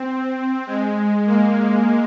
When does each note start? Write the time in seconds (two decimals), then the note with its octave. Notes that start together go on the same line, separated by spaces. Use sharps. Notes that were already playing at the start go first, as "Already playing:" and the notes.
Already playing: C4
0.67 G#3
1.26 A#3